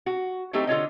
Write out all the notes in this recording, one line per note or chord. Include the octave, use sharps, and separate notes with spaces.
F#4
F#3 A3 C4 D#4 G4
D3 F4 C#5 D#5